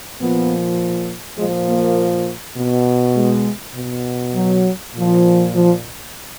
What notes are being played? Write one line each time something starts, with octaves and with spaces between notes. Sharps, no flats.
A#2 F3 B3
A#2 F3 G#3
A#3
B2
G#3
B2
F#3
A#2 F3
F3